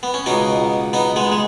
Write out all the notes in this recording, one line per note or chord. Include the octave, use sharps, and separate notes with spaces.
B3
C#4
C#2 B2 B3 D#4
B3 D#4
G#3 B3
G#3